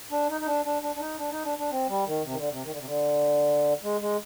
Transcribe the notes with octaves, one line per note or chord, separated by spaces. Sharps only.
D4
D#4
D#4
D4
D4
D4
D4
D#4
D4
D#4
D4
D4
C4
G3
D#3
C3
D#3
D3
C3
D#3
D3
C3
D3
G#3
G#3